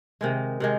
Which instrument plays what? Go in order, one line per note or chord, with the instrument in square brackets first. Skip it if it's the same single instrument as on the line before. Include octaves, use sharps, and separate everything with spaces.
[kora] C3 D#3 G#3
C3 D#3 G#3